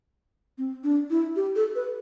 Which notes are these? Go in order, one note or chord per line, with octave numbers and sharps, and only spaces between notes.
C4
D4
E4
G4
A4
B4